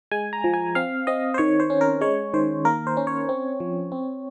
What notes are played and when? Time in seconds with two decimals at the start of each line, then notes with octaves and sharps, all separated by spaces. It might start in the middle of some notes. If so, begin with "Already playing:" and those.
0.11 G#3 G#5
0.33 A#5
0.44 F3
0.54 G#5
0.75 C4 F5
1.07 C4 D#5
1.34 C5
1.38 D#3 C#5
1.60 C5
1.70 C#4
1.81 A#4
2.01 G#3 C#5
2.34 D#3 C5
2.65 A#3 A#4
2.87 C5
2.97 C#4
3.07 C#5
3.29 C4
3.60 F3
3.92 C4